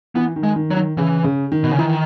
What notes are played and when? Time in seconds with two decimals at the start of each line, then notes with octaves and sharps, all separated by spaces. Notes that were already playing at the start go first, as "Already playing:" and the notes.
0.15 E3 B3
0.36 D#3
0.43 G#3
0.56 D#3
0.70 F#3
0.77 D#3
0.97 C#3 E3
1.24 C#3
1.52 D#3
1.63 B2
1.71 C#3
1.78 D#3 E3